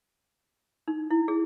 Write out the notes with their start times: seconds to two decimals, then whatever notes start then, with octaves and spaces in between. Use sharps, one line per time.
0.88 D#4
1.10 E4
1.28 G#4